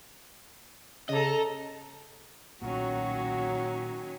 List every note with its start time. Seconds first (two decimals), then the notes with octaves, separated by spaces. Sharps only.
1.09 C#3 A4 D#5 A#5
2.62 D#1 B1 A#2 D#3 F#3 C#4 F#4